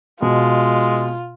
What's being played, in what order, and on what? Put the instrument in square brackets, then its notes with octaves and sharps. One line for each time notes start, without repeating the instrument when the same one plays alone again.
[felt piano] B2 [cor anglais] G#3 [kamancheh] F4